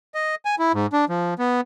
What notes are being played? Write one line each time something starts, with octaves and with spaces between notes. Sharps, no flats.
D#5
G#5
E4
G#2
D4
F3
B3